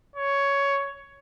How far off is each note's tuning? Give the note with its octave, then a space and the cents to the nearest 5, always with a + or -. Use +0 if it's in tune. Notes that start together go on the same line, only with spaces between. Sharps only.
C#5 +10